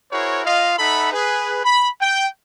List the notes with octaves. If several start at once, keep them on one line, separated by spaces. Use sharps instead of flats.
E4 F#4 G#4 A#4 C5 C#5
F4 D#5 F5
D#4 A4 E5 F#5 B5
G#4 B4
B5
G5